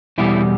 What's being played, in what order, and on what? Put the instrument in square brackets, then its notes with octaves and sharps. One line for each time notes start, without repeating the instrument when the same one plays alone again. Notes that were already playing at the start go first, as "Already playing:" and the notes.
[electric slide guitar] E2 B2 G3 E4